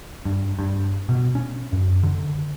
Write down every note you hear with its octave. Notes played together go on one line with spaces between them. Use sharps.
G2
G2
B2
C#4
F#2
D3